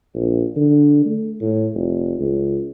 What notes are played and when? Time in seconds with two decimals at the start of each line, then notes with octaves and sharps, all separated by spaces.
0.15 A#1
0.56 D3
1.05 A3
1.41 A2
1.74 F1
2.19 C#2